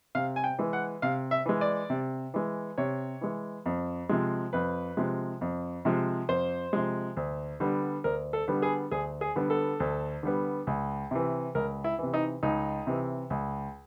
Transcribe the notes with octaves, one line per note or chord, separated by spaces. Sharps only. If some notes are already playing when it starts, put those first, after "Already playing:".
C3 F5
G#5
G5
E3 G#3
F#5
C3 F5
E5
E3 G#3
D5
C3
E3 G#3
C3 C#5
E3 G#3
F2
C3 F3 G#3
F2 B4
C3 F3 G#3
F2
C3 F3 G#3
F2 C5
C3 F3 G#3
D2
D3 G3 B3
D2 A#4
A4
D3 G3 B3
G#4
D2 G#4
G#4
D3 G3 B3
A4
D2
D3 G3 B3
C#2
C3 E3
C#2 A#4
E4
C3 E3
D#4
C#2 D#4
C3 E3
C#2